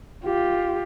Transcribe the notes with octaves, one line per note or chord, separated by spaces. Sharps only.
F4 G4